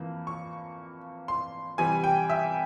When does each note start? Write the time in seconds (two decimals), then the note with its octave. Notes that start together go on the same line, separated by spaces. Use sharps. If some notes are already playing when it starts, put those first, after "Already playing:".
Already playing: F2 E3 A#3
0.27 C#6
1.28 C6
1.78 C3 E3 G3 G#5
2.04 G5
2.30 E5